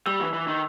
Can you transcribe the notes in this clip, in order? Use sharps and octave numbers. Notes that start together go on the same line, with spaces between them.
G3 E6
E3
E3
D#3